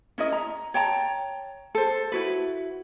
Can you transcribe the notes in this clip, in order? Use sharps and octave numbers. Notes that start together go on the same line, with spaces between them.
C#4 E4 A#4 D#5
A#5
C#5 G5 A5 A#5
A4 C5
E4 F#4 B4